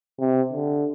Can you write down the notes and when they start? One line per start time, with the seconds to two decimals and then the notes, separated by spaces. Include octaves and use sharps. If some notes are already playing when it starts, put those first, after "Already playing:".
0.19 C3
0.53 D3